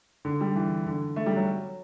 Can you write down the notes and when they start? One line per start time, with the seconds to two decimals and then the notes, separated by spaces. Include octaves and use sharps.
0.25 D3
0.41 G3
0.56 E3
0.87 D3
1.16 A3
1.26 G3
1.36 F#3